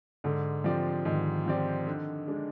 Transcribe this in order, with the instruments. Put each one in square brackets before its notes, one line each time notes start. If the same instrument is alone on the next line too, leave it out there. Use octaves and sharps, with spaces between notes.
[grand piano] G#2 [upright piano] D3
[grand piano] F3 C4 G4 D5
[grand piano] G#2 [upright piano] D#3
[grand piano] F3 C4 G4 D5
D3
G#3 D4